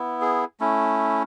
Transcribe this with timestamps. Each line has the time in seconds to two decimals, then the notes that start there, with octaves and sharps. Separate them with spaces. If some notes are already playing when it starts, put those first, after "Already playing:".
Already playing: B3 E4
0.21 G#4
0.60 A3 C#4 E4